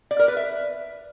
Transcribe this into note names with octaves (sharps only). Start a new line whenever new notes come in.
D5
A#4
B4
E5